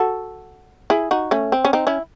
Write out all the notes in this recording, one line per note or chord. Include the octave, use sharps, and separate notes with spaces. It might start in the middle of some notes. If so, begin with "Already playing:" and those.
Already playing: F#4 A4
E4 G#4
D#4 F#4
A3 C#4
C4
C#4
C4 D#4
C#4 E4